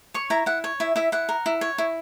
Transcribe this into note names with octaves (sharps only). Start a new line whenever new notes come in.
C#5 C#6
E4 A#5
E4 F#5
C#5
E4 E5
E4 E5
E4 F#5
A#4
E4
C#5
E4